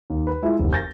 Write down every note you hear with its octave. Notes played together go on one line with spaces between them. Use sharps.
D#2
B4
G#3 E4 F4
F1 D#2
G6 A6 A#6